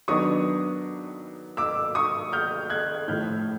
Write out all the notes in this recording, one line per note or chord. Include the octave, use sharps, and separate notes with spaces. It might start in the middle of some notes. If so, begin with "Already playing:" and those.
D#3 F#3 B3 D4 C#6 D#6
D6 E6
C#6 D#6
F6 G6
F#6 G#6
A2 F3 A3 F6 G6